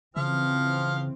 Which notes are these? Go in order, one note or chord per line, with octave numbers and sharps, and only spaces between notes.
C#3 E3 F3 C4 F5 F6